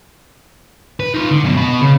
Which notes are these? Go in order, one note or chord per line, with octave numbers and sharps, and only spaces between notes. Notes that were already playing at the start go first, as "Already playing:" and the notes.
B4
D#4 F4
D3
F#2 B2
B2 B4
C#3